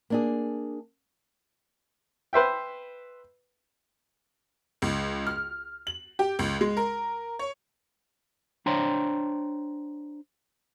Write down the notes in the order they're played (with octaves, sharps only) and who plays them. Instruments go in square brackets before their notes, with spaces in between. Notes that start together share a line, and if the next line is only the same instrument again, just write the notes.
[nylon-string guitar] A#3 D4 G#4
[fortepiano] B4 C5 E5 G5
[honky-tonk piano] C#2
F6
F#7
G4
C#2
G#3
A#4
C#5
[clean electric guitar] D4 C5 C#5 G5 A#5 C6